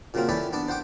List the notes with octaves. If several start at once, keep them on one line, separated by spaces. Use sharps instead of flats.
A#2 C#3 F#3 A#3 C4 F4
E3 C#4 G4 A4 B4 D5
B3 D4 D5
C5 F#5 G5 D6